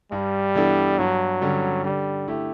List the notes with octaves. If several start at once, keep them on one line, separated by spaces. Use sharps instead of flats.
G2 G3
E3 B3 D4 A4
G2 F#3
D3 G3 C#4
D3 G3
A3 E4 G4